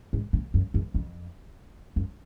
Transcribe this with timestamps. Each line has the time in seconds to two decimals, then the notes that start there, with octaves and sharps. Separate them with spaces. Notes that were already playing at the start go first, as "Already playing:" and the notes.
0.13 G#2
0.33 A#2
0.54 F#2
0.74 F#2
0.94 F2
1.96 F#2